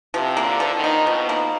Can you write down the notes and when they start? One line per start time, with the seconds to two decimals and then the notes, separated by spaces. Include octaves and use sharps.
0.14 C3 F3
0.37 A#3
0.44 D3
0.60 F3
0.75 D#3
0.84 D#4
1.07 B2 F3
1.29 A#3